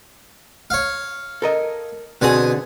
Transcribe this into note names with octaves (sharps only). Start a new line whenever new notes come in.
C#5 F5
A4 A#4 D#5
B2 D3 C4 G#4 G#5 D#6